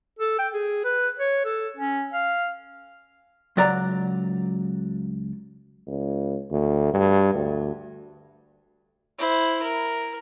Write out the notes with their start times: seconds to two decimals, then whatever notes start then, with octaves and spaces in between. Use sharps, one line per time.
0.19 A4
0.38 G5
0.54 G#4
0.84 B4
1.19 C#5
1.45 A4
1.77 C#4
2.13 F5
3.57 C#2 F#3 D5 F#5 A#5
5.87 C#2
6.51 D2
6.94 G2
7.34 D2
9.18 E4 C5
9.63 A#4